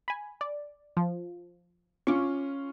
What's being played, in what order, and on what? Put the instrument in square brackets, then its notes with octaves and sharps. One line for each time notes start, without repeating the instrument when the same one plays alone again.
[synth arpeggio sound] G#5 B5
D5
F3
[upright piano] C#4 F4 [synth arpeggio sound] C#6 D6